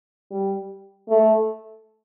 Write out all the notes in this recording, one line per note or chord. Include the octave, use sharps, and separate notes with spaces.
G3
A3